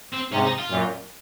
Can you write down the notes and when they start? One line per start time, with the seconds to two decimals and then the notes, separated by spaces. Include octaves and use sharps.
0.13 C4
0.32 G#2 C3 C#4
0.45 D#4
0.58 F4
0.70 F#2 A#2